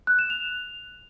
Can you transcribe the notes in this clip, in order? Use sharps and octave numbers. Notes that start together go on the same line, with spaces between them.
F#6
E7
F7